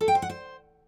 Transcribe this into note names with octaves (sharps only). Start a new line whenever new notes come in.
A4
G5
C5
F#5
C5